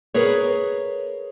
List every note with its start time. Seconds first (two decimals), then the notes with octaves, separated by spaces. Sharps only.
0.14 G#4 A#4 B4 C#5